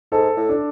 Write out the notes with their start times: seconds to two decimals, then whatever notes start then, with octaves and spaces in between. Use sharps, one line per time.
0.12 G#2 A4
0.37 A2
0.49 D4